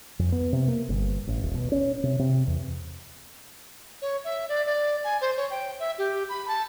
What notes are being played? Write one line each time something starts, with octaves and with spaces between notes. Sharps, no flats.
F2
B3
C3
A#3
G1
A1
D#1
B2
C#4
C3
C3
E2
C#5
E5
D5
D5
G#5
C5
C#5
G5
E5
G4
B5
A5